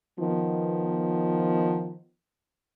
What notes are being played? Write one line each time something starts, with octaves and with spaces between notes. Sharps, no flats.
D#3 F3 B3